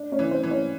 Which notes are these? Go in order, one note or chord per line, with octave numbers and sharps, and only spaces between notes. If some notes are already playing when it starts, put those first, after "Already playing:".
Already playing: D4 D5
C#4 C#5
E3
C4 C5
E3
C#4 C#5